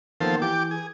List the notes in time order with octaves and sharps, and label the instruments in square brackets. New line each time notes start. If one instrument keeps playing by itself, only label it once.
[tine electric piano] D#3 A#3 B3 [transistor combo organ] F3 A4 C5
[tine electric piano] E3 [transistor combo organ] G4 D6
[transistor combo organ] G#4